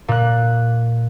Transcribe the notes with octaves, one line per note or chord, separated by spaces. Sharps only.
A#2 F#6